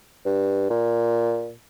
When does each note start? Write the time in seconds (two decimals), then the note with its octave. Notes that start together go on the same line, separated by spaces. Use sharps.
0.25 G2
0.70 A#2